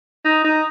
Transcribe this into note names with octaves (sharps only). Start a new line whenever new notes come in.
D#4
D#4